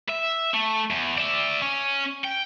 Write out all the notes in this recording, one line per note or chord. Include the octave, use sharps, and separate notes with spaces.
E5
A3
E2
D5 E5
C#4
G5